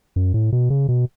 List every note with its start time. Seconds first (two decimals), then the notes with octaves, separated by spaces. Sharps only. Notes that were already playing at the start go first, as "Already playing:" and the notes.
0.16 F#2
0.34 A2
0.52 B2
0.70 C#3
0.89 B2